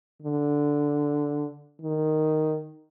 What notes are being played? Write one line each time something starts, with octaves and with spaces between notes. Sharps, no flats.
D3
D#3